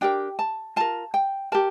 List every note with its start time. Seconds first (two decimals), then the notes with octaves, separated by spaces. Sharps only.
0.01 D4 G4 A#4 G5
0.39 A5
0.76 F4 A#4 A5
1.14 G5
1.52 G4 A#4 A5